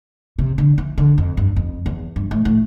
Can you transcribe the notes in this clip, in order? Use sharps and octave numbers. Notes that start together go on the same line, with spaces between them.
C3
D3
E3
D3
F2
G2
F2
E2
G2
A2
A2